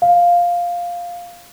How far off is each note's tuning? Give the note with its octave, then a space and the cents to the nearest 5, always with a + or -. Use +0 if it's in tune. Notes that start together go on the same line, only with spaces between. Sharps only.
F5 +5